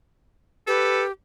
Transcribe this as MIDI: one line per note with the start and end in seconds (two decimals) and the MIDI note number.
0.67 1.11 67
0.67 1.02 69
0.67 1.05 71